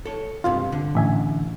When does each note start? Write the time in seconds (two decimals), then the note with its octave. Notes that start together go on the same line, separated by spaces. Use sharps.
0.05 A4 C#5
0.44 C#2 G2 C3 F4
0.72 D3
0.95 A1 E5 G#5